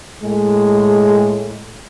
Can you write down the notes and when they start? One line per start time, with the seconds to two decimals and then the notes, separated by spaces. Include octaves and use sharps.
0.23 A2 G#3